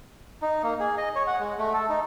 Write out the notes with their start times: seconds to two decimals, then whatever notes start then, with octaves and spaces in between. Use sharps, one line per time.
0.42 D#4
0.63 A#3
0.80 G#4
0.98 D#5
1.15 C#5
1.27 F#5
1.40 G#3
1.58 A3
1.73 A4
1.89 D#4